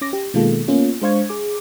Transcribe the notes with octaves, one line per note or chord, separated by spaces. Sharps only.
C#4 D6 A#6
G4
B2 D#3 G#3 A#3 F4 A4
A#3 B3 C#4 F4
G#3 D4 C5 F5 C#6 G#6
G#4 D6